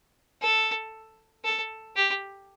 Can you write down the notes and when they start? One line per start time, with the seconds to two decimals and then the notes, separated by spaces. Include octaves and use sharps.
0.42 A4
1.44 A4
1.96 G4